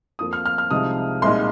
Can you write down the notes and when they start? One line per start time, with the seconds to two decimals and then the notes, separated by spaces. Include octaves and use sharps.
0.19 F2 F3 A#3 F4 D#6
0.33 F6
0.46 F6
0.58 F6
0.70 C2 C3 F3 G#3 D#4 D#6
1.22 C2 A#2 G#3 D#4 C6